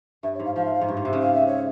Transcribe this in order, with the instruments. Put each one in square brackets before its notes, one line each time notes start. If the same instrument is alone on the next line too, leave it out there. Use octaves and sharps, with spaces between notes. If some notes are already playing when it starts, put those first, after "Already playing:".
[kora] G2 [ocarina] E5
[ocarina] C#5
[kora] G#2
[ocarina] F5
[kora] F3 [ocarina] F5
[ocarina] E5
F5
[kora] G#2
G2
G#2
C3
C#3
[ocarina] F5
E5
C#5